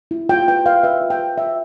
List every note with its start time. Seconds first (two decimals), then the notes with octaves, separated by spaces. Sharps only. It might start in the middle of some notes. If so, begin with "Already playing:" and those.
0.11 E4
0.29 F4 G5
0.48 B4 G5
0.66 B4 F5
0.83 B4 E5
1.02 F4
1.10 G5
1.19 B4
1.38 F4 E5